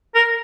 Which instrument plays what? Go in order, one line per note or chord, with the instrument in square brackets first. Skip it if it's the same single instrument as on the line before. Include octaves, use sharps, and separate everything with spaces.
[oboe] A#4